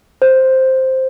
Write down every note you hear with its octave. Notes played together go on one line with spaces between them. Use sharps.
C5